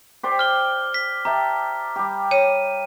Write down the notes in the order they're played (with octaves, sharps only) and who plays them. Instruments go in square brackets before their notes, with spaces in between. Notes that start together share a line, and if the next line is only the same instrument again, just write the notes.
[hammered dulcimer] G4 C5 D5
[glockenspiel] F6 G7
B6
[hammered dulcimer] G4 E5 A5 [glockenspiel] A#5
[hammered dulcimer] G3 G4
[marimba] C#5 [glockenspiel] D#7